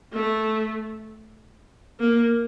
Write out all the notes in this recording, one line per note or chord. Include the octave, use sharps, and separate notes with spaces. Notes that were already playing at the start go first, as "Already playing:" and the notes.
A3
A#3